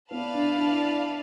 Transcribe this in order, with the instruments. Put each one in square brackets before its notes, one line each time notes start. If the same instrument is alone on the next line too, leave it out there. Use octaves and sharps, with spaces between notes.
[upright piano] B3 [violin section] E4 B4 D5 F5 A5
[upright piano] D4
D4